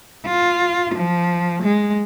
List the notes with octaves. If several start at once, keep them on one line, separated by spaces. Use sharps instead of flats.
F4
F3
G#3